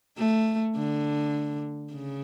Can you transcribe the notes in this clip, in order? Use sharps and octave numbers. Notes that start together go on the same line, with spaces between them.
A3
D3
C#3